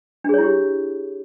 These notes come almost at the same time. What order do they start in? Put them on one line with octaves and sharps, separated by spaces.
D4 G#4 C#5 E4 G4